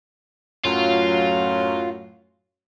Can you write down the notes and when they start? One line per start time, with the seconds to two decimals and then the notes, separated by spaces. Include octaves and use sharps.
0.65 F#2 A2 F#3 F4